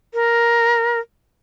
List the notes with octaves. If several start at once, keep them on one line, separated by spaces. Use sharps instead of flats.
A#4